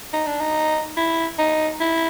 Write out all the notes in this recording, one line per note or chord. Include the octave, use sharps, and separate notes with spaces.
D#4
D4
D#4
E4
D#4
E4